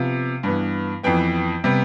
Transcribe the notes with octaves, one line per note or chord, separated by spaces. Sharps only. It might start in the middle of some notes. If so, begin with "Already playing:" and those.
Already playing: C3 F3 B3 F5
G2 E3 B3
F2 E3 B3 G5
C3 G3 B3